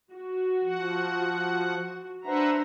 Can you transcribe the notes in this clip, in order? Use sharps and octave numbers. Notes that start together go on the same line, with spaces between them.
F#4
F3 F#5
D4 B4 C5 E5 F#5 A#5